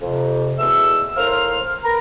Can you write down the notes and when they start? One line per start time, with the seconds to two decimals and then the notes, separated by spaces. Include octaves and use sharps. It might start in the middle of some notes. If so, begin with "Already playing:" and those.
0.01 F2 C3
0.58 E2 B2 G#3 A3 E6
1.17 A2 A#4 C5 F5 C6 F6
1.83 A#4 B4 A#5